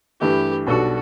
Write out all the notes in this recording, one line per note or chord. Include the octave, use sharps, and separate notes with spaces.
G2 E3 A3 G4
B1 B2 G3 D4 F#4 A4